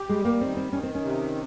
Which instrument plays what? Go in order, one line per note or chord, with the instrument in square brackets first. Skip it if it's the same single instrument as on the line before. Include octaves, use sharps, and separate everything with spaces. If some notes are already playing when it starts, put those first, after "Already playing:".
Already playing: [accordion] G4
[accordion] G3 [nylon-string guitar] G#3
[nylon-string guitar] A#3
[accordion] D#3 [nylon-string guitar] C4
[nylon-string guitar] C4
[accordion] D#3 [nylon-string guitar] C#4
[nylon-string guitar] C4
C#4
[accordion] C3